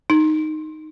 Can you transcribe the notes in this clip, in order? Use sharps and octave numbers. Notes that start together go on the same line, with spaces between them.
D#4